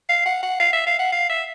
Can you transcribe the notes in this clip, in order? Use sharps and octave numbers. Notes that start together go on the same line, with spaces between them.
F5
F#5
F#5
F5
E5
F5
F#5
F5
E5